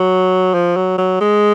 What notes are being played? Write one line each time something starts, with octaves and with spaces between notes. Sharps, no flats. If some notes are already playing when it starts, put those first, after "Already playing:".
Already playing: F#3
F3
F#3
F#3
G#3